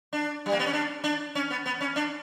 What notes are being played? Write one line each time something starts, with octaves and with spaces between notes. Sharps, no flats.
D4
G3
A#3
B3
C#4
D4
D4
C#4
B3
B3
C#4
D4